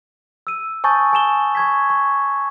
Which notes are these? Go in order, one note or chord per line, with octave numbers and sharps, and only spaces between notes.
E6 D#7
G#5 A5 C#6 D#6 G6 A6
G#5 A5 E7 G7
C#6 G#6 B6
C#6